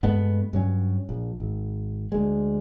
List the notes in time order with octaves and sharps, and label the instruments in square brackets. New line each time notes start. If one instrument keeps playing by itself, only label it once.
[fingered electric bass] G2 G#3 A3 B3
G2 F#3 C#4
A#1
G#1
D2 G#3